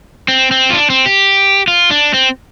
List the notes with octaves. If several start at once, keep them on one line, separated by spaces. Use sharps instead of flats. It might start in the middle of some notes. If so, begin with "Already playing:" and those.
C4
C4
F4
D4
C4
G4
F4
D4
C4